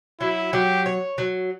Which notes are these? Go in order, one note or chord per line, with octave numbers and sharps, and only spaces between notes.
F#3 E4
F#3 G4
C#5
F#3